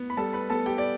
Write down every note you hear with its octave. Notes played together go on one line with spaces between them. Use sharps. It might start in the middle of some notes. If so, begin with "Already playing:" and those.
Already playing: B3
B5
G3 A4 A5
B4 B5
B3 A4 A5
G4 G5
D5